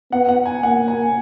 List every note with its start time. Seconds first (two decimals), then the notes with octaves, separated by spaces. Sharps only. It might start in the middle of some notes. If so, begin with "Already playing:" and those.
0.12 B3 F#5
0.29 F#5
0.46 G#5
0.62 A#3 F#5
0.88 G#5